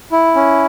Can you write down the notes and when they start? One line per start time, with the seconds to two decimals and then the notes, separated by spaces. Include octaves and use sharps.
0.12 E4
0.36 C#4